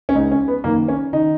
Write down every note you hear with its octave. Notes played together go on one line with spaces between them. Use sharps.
C#4
C#2 C#3 D#4
C#4
B3
F#2 D#3 A#3
C#4
D#3 D#4